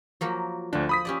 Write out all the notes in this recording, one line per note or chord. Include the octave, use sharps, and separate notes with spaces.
F3 F#3 A#3
D2 F3 D4
B5 D#6 B6
C#4 G4 D5